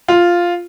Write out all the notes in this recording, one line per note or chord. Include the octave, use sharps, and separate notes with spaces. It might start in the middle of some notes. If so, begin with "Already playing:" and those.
F4